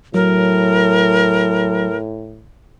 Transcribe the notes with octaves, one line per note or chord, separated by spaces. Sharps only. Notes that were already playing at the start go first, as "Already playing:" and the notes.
A2 F#3 A#4